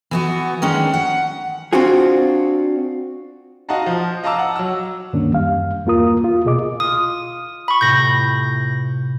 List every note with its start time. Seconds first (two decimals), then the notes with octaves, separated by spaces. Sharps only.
0.11 E3 B3 F#4
0.62 D#3 G#3 C#4 D4
0.94 F#5
1.73 C4 D4 F4 F#4 G#4
3.69 F#4 D#5 F5 F#5 A5 A#5
3.86 F3
4.24 D#5 F5 A5 A#5 D6 E6
4.39 F#5
4.56 F#3 E6
5.13 D2 G2 D#3 A#3 C#4 D4
5.33 F#2 G3 F5
5.85 E2 G2 A#3 F4 A#4 D#6
6.24 F4
6.45 C2 B2 G#4 D#5 D6
6.80 F4 D#6
7.68 B5 C#6
7.81 A2 C3 G6 A#6